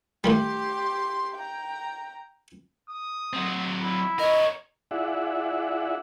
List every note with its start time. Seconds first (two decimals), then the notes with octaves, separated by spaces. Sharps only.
0.24 A2 D#3 G3 G4 C6
1.35 G5 A#5
2.90 D#6
3.33 F#3 C4
3.80 E4
4.19 A#4 C#5 D#5
4.91 E4 F4 G#4 D5 E5 F#5